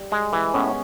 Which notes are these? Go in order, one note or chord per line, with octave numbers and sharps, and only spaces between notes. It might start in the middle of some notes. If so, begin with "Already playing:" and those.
Already playing: G3
G#3
E3 G#3
A2 B3 C#4